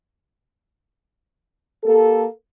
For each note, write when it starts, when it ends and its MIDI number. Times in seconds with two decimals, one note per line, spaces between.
1.84 2.25 58
1.84 2.25 67
1.84 2.25 69